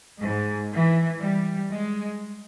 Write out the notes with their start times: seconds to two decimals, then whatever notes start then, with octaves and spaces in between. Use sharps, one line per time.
0.23 G#2
0.73 E3
1.22 G3
1.71 G#3